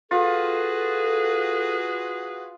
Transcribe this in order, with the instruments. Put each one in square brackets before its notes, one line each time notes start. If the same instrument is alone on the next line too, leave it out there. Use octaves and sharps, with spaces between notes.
[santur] F4 [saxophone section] F#4 G#4 B4 [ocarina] A4